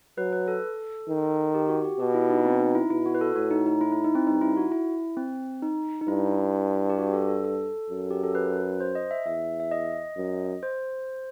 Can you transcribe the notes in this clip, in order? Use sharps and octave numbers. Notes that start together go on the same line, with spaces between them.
F#3 B4
B4
A4
D#3
G4
F#4
G4
B2 G4
E4
D#4
C4
D#4
E4
B2 E4
F#4
B4
A4
A2 F#4
D#4
D#4
E4
E4
D#4
C4
G2 D#4
E4
F#4
E4
C4
D#4
D#4
G2 E4
G4
F#4
A4
A4
A4
F#2
G4
A4
B4
C5
D#5
E5
E2 E5
E5
D#5
F#2
C5